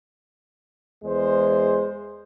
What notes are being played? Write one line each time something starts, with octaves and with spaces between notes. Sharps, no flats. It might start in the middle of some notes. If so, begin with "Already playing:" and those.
E2 G#3 C5